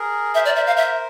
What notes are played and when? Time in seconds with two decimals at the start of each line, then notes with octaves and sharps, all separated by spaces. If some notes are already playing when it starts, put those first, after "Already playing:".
Already playing: G#4 A#4
0.35 A#4 C5 E5
0.45 D5
0.56 E5
0.67 F5
0.77 E5